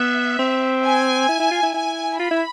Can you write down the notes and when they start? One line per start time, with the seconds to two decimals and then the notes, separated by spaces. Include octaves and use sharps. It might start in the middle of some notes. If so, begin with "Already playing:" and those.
Already playing: B3 E5
0.39 C4
0.84 G#5
1.29 E4
1.40 E4
1.51 F4
1.63 E4
1.74 E4 G#5
2.19 F4 B5
2.31 E4